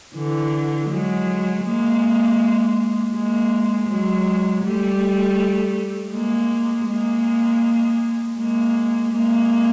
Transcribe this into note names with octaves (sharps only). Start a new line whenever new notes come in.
D3 E3
F#3 G#3
G#3 A#3
G#3 A#3
F#3 G#3
G3 A3
G#3 A#3
G#3 A#3
G#3 A#3
G#3 A#3